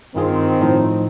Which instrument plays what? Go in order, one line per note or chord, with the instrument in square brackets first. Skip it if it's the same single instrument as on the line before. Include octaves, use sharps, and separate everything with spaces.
[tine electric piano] G2 F4 G#4 [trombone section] D#3 C4
[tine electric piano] A2 F3 D#4